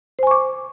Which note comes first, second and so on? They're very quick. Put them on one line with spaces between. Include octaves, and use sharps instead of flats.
C5 G#5 C#6 D6